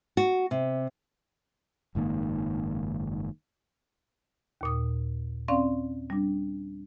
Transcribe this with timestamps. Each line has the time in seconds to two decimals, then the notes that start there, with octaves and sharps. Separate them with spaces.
0.17 F#4
0.51 C3
1.95 F#1 G#2 D#3 A#3
4.61 D#2 A#2 D#6
5.48 C4 C#4 D5 F5 C6
6.10 G3 D4